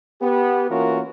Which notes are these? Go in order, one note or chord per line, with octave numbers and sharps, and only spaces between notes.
B3 G4
E3 A#3 C#4 F4 F#4 A#4